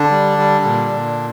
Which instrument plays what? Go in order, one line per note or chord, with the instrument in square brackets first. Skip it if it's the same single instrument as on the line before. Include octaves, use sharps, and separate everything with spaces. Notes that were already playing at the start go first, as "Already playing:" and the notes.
Already playing: [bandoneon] D3 D4
G3
G3
A#2
A#2